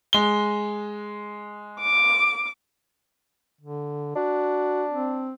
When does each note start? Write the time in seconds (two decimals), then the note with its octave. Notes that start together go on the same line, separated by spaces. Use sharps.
0.13 G#3 G7
1.81 D6
3.61 D3
4.16 D4 F#4
4.89 C4